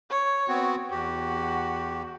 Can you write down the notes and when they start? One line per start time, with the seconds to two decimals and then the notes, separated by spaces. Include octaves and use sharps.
0.10 C#5
0.48 B3 C4 F#4
0.90 E2 F#4 G4